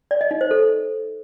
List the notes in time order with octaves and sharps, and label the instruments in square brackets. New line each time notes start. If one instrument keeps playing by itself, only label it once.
[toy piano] D5
D#5
D#4
C5
A4